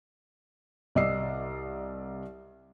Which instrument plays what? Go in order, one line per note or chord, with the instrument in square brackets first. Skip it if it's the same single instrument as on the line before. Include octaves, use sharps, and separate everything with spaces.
[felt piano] C2 D5 D#5 E6 C7